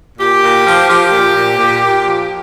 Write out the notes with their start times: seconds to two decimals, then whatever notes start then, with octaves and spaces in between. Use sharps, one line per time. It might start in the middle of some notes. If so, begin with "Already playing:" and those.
0.18 A#2 G4
0.42 A#2
0.64 F3
0.88 F3 G4
1.12 A#2
1.35 A#2
1.58 A#2
1.82 A#2
2.05 F3